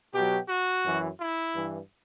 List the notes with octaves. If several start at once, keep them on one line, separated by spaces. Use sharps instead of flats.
B2 F#3 G4
F#4
F#2 E3
E4
G2 E3